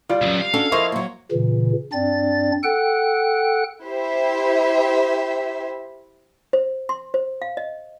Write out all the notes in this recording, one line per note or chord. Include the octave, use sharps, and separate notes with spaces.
G3 F4 D5
C#2 F#2
F5
C#4 D4 F#4 A4
F3 E4 G#4 A#4 C5 D#5 C#6
F#3 A#3
A#2 C#3 E3
G2 C4 D4 D5 A6
A4 F#5 G5 F#6
E4 G4 C5 E5
C5
C6
C5
F5
D#5